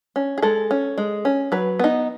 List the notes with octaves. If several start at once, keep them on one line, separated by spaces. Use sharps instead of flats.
C#4
G#4
G#3 A4
C#4
G#3
C#4
F#3 B4
B3 D#4